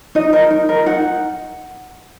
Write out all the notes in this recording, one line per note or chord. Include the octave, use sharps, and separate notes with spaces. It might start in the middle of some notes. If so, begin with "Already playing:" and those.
D#4 D#5
A#4
D#4
A#4
D#4 F#5